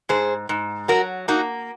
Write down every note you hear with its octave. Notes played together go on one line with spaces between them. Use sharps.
G#2 G#4 C5
G#2
F#3 F#4 A#4
A#3 D#4 F#4